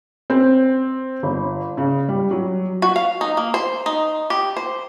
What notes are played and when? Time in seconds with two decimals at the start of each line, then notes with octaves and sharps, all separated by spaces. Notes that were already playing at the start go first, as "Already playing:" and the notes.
0.30 C4
1.23 G1
1.77 C#3
2.09 G3
2.31 F#3
2.82 F#4
2.96 F5
3.21 D#4
3.37 A#3
3.54 C5
3.86 D#4
4.30 G4
4.57 C5